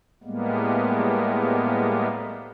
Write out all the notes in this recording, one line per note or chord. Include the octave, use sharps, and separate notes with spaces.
A2 G3 G#3 A#3 B3